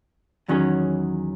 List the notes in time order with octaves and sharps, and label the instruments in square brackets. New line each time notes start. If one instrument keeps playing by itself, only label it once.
[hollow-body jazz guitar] E2 D#3 F#3 C#4 G#4